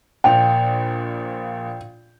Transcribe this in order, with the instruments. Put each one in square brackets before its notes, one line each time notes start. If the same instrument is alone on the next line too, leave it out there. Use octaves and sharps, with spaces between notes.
[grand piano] A#1 A#2 F7 [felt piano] G5